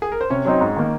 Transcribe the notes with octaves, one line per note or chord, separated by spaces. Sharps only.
G#4
A#4
C5
C3 C#4 C#5
F#3 C4 D#4
G#2
D#3 A#3